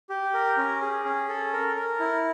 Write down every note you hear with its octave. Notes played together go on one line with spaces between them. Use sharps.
G4
A#4
C#4
G#4
C#4
A4
A#4
A#4
E4